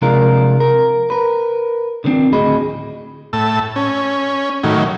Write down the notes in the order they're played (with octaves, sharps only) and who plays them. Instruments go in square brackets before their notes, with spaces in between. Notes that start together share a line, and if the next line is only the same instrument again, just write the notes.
[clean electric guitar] C3 F3 G#3 D4 F4 A#4
A#4
A#4 B4
D3 D#3 F3 C4 D4
D2 A2 F#4 G#4 D#5 B5
[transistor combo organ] A2 A5 E6
C#4
A2 D#3 F#3